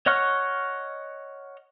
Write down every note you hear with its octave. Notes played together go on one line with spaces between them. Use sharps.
C#5 D#5 F#5 C#6 F6